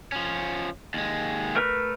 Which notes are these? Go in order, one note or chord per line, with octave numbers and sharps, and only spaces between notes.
F3 C#4
D#2 G#3
A3 A#4 B4